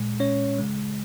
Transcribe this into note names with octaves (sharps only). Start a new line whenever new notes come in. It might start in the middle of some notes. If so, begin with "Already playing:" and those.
Already playing: A#2 G#3
C#4 C#5
C#3 G#3